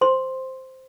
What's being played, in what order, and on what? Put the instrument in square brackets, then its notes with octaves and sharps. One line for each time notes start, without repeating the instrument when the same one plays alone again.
[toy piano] C5 C6